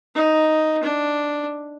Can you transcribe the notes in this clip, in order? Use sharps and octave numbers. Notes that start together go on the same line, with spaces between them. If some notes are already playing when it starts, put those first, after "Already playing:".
D#4
D4